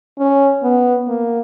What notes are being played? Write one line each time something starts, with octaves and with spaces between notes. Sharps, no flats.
C#4
B3
A#3